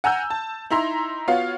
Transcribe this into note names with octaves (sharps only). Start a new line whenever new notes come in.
F#5 G#5 A#5 E6 G6
A5
D#4 E4 E5 A#5 C6
B3 F4 F#4 C#5 F5